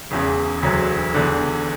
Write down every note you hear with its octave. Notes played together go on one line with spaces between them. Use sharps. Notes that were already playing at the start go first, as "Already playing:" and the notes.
E1 E2 C#3
E1 D2 D3 F#3
E1 E2 D3